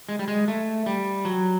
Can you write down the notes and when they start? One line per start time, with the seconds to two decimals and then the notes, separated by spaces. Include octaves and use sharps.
0.09 G#3
0.19 G3
0.28 G#3
0.48 A3
0.86 G3
1.25 F#3